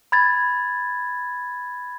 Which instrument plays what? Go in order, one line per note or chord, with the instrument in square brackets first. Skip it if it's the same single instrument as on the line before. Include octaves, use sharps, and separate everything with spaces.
[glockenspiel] B5 G#6 A6